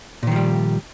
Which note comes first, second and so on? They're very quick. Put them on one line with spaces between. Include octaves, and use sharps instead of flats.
A#2 D#3 F3 G3